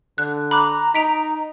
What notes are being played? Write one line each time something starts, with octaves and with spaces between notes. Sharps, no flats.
D3 F#6
A#5 B5 D6 F#6
D#4 B6 D7 F7